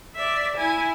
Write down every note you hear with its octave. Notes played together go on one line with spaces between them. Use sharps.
D5 E5
E4 G#5